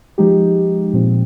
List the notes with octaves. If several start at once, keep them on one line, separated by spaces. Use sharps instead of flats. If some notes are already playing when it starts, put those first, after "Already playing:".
F3 G#3 D#4 G4
A#2 F3 C4